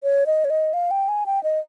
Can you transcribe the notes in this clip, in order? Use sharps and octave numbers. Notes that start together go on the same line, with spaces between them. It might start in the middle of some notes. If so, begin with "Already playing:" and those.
C#5
D#5
C#5
D#5
F5
G5
G#5
G5
D#5